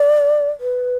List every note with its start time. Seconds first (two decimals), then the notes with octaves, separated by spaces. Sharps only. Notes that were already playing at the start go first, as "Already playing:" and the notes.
Already playing: D5
0.60 B4